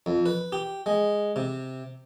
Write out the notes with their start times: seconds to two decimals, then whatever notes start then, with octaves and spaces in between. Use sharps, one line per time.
0.06 F2
0.26 B4
0.52 G4
0.86 G#3
1.36 C3